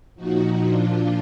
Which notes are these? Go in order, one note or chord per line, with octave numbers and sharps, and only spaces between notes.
A#2 F3 D#4 F#4
A#2 F3 D4 F4